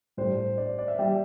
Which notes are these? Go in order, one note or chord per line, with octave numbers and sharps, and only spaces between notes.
A2 G3 D4 G4 C5
D5
D5
E5
G3 D4 G4